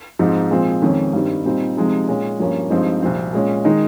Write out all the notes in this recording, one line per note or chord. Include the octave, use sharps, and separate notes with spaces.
G#2 F3 C4 D#4
A#2 F3 G#3 C4
F2 D#3 G#3 C#4
G2 D#3 G3 C4 D#4
A#2 G3 C4 D#4
C3 F3 G#3 D#4
A#2 G#3 C#4
G2 F3 A#3 C#4
G2 F3 G#3 C4 D#4
C2 A#2 F3 C4
A#2 G#3 C#4
D#3 G#3 D#4